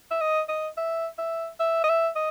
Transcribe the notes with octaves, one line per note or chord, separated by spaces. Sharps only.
E5
D#5
D#5
E5
E5
E5
D#5
E5
D#5